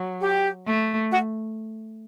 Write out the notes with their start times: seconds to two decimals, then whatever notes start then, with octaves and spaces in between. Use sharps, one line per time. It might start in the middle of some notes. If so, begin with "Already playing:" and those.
Already playing: F#3
0.20 G4
0.67 A3
1.10 F#4